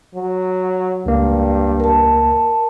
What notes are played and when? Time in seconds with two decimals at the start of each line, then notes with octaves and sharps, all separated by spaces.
0.15 F#3
1.06 C#2 G2 A#3
1.80 A#4 A5